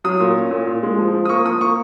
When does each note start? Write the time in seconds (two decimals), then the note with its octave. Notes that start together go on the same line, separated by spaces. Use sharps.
0.04 F#3 D#6
0.20 A#2
0.36 C#4
0.51 A#2
0.67 A#2
0.83 G#3
0.98 F3
1.14 F3
1.25 D#6
1.29 A#3 C#6
1.46 F3 D#6
1.61 A#3 C#6